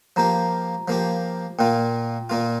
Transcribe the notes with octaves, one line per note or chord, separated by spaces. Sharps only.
F3 A#3 G4 A#5
F3 A#3 G4
A#2 A#3 F4 G5
A#2 A#3 F4